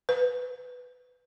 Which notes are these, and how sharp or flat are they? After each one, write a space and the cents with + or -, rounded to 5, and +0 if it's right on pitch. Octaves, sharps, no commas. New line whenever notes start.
B4 +10